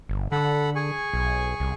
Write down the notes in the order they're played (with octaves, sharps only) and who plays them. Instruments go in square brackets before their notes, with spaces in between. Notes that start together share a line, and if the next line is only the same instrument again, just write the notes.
[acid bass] G1
[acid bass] D3 [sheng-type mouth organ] A4 F#5 B5
[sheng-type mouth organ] G#4 G#5 C#6
[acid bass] B1
C2